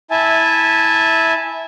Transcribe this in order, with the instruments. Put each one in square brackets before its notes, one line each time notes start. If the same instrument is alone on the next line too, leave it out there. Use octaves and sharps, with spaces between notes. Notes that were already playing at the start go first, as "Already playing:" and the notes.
[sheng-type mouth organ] E4 E5 G#5 A5